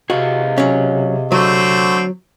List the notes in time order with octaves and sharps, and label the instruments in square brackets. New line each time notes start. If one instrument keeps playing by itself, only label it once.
[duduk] C3 [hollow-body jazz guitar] F#4 [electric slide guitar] G#4 D#5 F5
[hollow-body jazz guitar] F#3 C#4
[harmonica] D3 A3 C4 [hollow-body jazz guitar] F#3